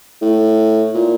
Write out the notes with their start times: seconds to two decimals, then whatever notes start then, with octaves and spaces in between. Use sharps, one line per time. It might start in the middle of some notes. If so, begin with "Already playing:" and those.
0.22 A2
0.94 A#2